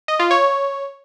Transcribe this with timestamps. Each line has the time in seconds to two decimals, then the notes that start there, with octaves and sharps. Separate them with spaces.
0.08 D#5
0.19 F4
0.31 C#5